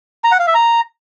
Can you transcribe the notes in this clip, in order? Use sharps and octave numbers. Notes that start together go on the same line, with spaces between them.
A#5
F#5
F5
E5
A#5